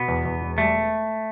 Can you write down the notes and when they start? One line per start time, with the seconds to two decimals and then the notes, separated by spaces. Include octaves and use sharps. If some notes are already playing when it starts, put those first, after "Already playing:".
Already playing: B2 B3
0.08 E2
0.25 E2
0.41 E1
0.58 G3 A3